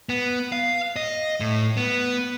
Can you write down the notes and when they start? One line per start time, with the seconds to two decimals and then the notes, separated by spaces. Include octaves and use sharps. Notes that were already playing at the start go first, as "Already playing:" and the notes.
0.09 B3
0.52 F5
0.96 D#5
1.40 A2
1.77 B3